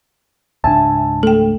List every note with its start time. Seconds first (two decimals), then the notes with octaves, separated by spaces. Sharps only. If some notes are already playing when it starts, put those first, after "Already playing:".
0.64 C#2 G#2 D4 E5 G#5 A5
1.23 A3 A4 G5